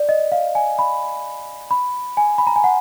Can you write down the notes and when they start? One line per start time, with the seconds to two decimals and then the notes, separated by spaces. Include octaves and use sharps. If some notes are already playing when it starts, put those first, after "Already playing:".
Already playing: D5
0.09 D#5
0.32 F5
0.55 G#5
0.79 B5
1.71 B5
2.17 G#5
2.38 B5
2.47 A#5
2.56 G#5
2.64 F#5